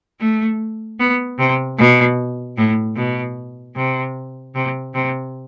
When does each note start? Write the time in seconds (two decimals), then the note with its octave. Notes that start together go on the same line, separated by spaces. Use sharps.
0.20 A3
1.00 B3
1.39 C3
1.78 B2
2.57 A2
2.96 B2
3.76 C3
4.55 C3
4.94 C3